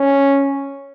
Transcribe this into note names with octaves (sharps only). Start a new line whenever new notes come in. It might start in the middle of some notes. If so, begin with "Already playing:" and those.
Already playing: C#4